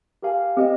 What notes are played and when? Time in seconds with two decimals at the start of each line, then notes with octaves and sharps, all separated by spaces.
0.22 G4 A#4 F5 G#5
0.57 C4 G4 A#4 D#5